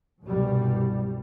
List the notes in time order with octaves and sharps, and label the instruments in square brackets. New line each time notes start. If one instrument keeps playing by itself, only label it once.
[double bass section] C2 G2 B2 G3